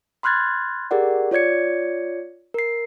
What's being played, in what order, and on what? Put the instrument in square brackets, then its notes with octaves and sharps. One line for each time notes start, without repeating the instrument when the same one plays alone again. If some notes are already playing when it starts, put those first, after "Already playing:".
[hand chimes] B5 C6 F6 F#6 G#6 A6
G4 G#4 A#4 D5 F#5
F4 C#5 D5 G#6 C#7
A#4 C7